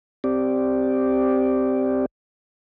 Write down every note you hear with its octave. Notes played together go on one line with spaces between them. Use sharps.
C4 G4 D5